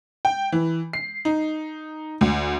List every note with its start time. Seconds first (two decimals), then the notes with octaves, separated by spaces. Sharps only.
0.25 G5
0.52 E3
0.93 C7
1.25 D#4
2.21 D2